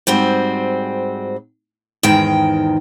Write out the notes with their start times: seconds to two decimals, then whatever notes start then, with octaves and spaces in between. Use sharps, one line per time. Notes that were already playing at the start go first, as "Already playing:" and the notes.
0.07 G#2 G3 C4 F#4
2.03 E2 G#2 D#3 G5